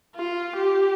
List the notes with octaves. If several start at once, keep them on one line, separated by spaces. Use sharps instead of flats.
F4
G4